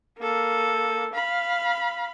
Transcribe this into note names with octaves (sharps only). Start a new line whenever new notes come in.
A#3 A4
F5 B5